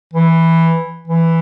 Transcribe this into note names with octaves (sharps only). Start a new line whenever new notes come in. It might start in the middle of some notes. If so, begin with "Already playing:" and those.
E3
E3